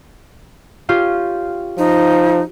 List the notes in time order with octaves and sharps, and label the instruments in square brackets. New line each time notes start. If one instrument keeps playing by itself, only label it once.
[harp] C#4 F4 G4
[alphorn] F3 [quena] D#4